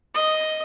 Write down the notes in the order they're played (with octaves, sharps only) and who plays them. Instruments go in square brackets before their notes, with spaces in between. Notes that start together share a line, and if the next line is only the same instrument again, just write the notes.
[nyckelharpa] D#5